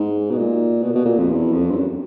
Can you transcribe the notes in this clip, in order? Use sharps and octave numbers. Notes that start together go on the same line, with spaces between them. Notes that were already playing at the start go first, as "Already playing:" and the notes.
Already playing: G#2
B2
A#2
B2
A#2
B2
A#2
F2
E2
F2
G2
F#2